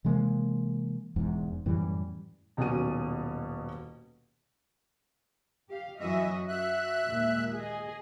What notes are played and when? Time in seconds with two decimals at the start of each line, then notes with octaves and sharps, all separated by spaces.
0.05 C3 E3 G#3 A#3
1.16 E1 E2 G#2
1.66 F#2 A2 E3 G3
2.57 D#1 B2 F#3 C#4 F#4 D#7
5.69 G4 F5
5.99 F#2 E3 F#4 D#5 E5
6.48 F#4 E5 F#6
7.08 D#2 A#2 G#3
7.54 G#4 D#5